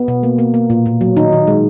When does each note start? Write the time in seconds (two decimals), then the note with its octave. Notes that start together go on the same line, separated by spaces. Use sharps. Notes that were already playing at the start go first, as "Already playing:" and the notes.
Already playing: B3
0.08 B2
0.23 A#3
0.38 A#3
0.54 A#3
0.70 A#2
0.86 A#2
1.01 F#3
1.17 D#3 D#4
1.33 D#3
1.47 G#3